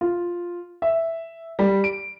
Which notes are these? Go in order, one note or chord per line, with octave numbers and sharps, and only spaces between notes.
F4
E5
G3
D7